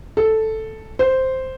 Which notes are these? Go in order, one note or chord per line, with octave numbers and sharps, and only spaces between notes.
A4
C5